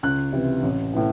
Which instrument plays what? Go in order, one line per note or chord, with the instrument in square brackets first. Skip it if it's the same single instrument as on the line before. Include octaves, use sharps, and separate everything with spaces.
[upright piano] C#2 F#6
C3 E3
A1
A2 E3